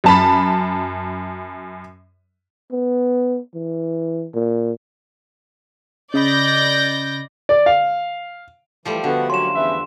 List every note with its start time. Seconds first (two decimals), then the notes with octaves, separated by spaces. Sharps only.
0.04 F#2 A5 B5
2.72 B3
3.55 E3
4.34 A#2
6.14 C#3 D5 D#5 B5 G6 A#6
7.49 D5
7.66 F5
8.85 E3 F3 G3 A3
9.04 D3 B3 F#4 F#5
9.30 F#3 A#3 C#4 F#4 C6 E7
9.54 E2 C#4 B4 E5